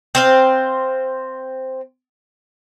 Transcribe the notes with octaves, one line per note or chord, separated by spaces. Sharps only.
C4 C5 F5